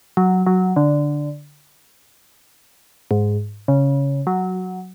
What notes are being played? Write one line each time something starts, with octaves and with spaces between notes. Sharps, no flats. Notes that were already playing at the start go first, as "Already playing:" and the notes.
F#3
F#3
D3
G#2
C#3
F#3